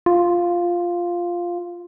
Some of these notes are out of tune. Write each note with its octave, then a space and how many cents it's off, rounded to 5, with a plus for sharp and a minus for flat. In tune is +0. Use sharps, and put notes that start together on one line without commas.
F4 +0